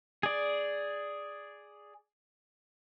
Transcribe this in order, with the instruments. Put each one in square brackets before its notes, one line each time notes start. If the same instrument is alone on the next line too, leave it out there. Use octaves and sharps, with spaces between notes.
[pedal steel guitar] G#4 D5